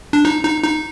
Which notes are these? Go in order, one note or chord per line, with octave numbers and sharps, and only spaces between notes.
D4
D#4
D#4
D#4